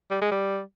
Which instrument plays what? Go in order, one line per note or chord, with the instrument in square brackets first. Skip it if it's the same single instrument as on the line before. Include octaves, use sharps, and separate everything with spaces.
[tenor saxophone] G3
G#3
G3